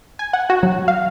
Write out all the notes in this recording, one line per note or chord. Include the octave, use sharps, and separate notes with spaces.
G#5
F#5
F#4
F#3
F5